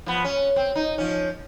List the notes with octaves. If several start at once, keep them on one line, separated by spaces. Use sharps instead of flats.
F3 B3
C#4
C4
D#4
F3 C#4